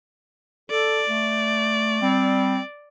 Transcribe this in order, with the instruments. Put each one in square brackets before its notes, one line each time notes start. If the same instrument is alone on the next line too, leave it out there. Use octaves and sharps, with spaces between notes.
[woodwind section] A4 [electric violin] D5
[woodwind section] A3
G3 C4